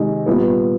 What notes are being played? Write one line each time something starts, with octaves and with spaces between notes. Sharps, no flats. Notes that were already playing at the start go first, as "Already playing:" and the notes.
Already playing: C3 D#3 G#3
A#2 G3 B3